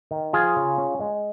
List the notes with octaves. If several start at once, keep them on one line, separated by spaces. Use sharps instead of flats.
D#3
F3 F4 G#4
C#3
C#4
G#3